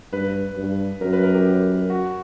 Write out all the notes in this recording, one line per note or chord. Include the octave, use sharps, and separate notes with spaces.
G2 B4
G2
F#2 A#4
B4
A#4
G4
F#4